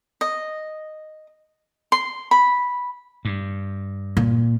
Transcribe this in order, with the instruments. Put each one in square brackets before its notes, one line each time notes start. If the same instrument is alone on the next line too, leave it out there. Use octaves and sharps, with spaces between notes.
[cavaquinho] D#5
C6
B5
[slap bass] G2
[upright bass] A#2